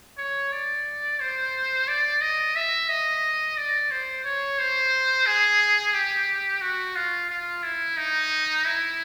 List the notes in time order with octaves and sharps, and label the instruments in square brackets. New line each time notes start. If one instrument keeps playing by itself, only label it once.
[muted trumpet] C#5
D5
C5
D5
D#5
E5
D#5
D5
C5
C#5
C5
G#4
G4
F#4
F4
F4
E4
D#4
E4